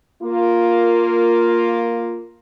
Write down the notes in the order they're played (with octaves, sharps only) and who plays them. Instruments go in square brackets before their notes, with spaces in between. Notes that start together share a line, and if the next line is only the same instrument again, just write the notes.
[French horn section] A#3 F4